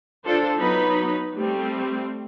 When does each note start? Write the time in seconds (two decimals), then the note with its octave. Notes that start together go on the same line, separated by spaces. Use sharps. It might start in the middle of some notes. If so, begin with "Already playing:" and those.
0.25 D4 F4 A4 C5
0.58 F#3 B3 D#4 B4 B5
1.37 G3 A3 C4